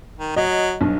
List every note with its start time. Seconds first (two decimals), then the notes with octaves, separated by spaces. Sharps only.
0.19 D#3
0.36 F#3 D#5
0.81 B1 G2